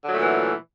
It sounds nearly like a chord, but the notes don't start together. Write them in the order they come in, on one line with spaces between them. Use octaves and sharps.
D3 F#3 A3 A#2 E3